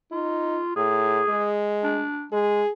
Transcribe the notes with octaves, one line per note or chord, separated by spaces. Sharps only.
D#4 F4
A2 G#4
G#3
D4
G#3 G#4